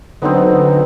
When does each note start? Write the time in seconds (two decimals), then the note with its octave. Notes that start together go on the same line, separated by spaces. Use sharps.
0.22 D3 F#3 B3 C4 D#4